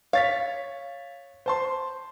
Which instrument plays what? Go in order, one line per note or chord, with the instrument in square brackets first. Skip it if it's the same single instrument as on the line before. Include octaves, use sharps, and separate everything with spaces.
[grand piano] C#5 A6 B6 [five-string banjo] F5
[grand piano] C5 A5 C6